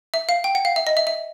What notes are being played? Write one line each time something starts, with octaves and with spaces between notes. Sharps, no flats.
E5
F5
G5
F#5
F5
E5
D#5
E5
E5